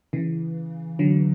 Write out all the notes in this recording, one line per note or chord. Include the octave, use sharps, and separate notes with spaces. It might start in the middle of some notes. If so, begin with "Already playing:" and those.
C#3 E3
D3 F#3